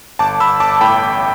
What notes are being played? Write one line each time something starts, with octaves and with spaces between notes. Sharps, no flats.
G1 A5 D6
G1 B5 E6
G1 A5 D6
A2 G5 B5
A1